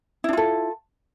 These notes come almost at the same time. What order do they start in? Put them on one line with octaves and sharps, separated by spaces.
E4 D4 F4 A4